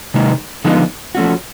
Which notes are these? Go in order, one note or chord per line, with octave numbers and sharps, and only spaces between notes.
C3 D#3 G#3
D3 F3 G#3 B3 D#4
F3 A3 C#4 F#4